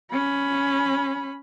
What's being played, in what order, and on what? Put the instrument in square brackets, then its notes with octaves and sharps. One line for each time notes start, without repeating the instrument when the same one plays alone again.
[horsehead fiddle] C#4 B5